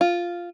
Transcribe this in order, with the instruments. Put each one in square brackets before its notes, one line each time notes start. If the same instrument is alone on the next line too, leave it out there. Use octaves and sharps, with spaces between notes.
[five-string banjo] F4